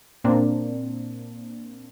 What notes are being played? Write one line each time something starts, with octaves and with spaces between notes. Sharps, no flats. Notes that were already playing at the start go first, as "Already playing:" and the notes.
A#2 A#3 C4 D4